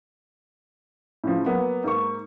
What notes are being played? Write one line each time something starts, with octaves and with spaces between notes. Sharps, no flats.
A2 C#3 F3
F#3 A#3 B3
G#2 A#3 C#6